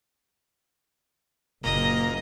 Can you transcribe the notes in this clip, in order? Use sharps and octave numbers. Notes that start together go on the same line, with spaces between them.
F#1 A#2 D#5 A#5